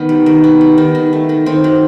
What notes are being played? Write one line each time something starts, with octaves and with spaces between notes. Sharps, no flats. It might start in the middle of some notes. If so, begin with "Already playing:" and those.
Already playing: D#3 B3 D#4
G3
D#3
B3
G3
D#3
D#3
A3
D#3
D#3 C4
F#3